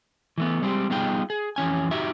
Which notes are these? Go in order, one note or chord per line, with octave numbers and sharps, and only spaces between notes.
E3 A3 B3
G3 G#3 C4 G4
G3 B3 D#4 F4 G#4 G5
G#4
F2 E3 C#4 G#5
D#4 F#4 G4 E5